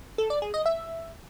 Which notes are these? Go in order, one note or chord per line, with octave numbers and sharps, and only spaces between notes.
A4
D5
G#4
D#5
E5